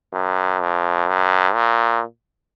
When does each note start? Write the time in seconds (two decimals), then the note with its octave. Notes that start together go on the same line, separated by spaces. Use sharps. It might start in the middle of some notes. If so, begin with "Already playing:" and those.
0.13 F#2
0.61 F2
1.08 F#2
1.54 A#2